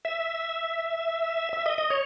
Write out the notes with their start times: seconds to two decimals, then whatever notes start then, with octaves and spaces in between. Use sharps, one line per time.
0.05 E5
1.53 E5
1.66 D#5
1.78 D#5
1.90 C#5